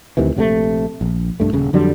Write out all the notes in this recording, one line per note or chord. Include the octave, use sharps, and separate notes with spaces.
D2 C3 D#3 E3
A#1 C3 F3 A3
A#1
C2 G2 A3
D#1 C#3
F2 D3 F#3 G3